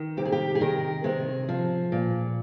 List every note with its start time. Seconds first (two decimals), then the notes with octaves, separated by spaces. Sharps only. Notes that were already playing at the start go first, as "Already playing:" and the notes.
Already playing: D#3
0.17 C3 G4
0.25 G#4
0.32 G4
0.55 G#4
0.61 D#3 A#4
1.04 C3 G#4
1.49 F3
1.92 A#2